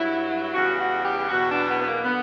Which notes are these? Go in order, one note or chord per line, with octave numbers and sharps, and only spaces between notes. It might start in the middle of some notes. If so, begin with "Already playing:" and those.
Already playing: G2 F#3 E4
E4
E2 C#3 G3 F#4
F#4
G4
E2 B2 F#3 F#4
D4
B3
B3
A#3
D3 B3